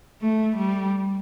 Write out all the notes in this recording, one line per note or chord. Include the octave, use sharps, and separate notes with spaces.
A3
G3